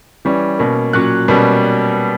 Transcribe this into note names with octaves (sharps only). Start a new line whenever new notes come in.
E3 G3 C#4
B2 A#3 C#4
A#2 F#3 C#4 F#6
B2 G3 A#3 C#4